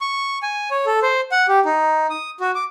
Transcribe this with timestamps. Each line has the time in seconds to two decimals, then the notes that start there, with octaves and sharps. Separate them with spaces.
0.01 C#6
0.43 G#5
0.71 C#5
0.86 A4
1.02 C5
1.32 F#5
1.48 G4
1.65 D#4
2.10 D#6
2.40 F#4
2.55 D6